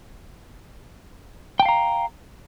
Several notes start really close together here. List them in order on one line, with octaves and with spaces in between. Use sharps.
G5 A5 F5 A#5